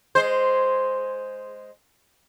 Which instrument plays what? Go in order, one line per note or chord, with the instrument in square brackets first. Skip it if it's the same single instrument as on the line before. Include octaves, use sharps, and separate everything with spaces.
[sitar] G#3 C5